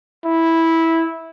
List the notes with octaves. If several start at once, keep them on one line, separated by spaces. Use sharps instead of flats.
E4